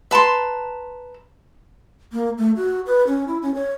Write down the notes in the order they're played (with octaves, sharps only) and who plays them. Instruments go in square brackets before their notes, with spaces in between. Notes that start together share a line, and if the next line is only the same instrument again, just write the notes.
[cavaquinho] B4 A5 A#5 C6
[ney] A#3
A3
F#4
B4
C#4
E4
C#4
C#5